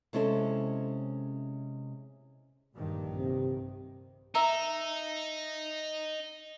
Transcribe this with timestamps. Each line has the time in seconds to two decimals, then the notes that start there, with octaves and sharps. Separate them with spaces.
0.13 C3 G#3 C#4 E4 A4 C5
2.75 A#1 G2 D#3
3.16 C3
4.35 D#4 E5 A#5